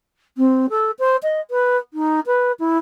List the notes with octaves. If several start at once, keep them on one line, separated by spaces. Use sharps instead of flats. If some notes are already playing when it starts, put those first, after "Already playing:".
C4
A4
C5
D#5
B4
D#4
B4
E4